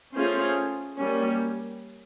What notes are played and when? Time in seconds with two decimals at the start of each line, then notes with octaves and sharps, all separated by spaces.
0.14 A3 C#4 F4 G#4 C5
0.96 G3 A#3 C#4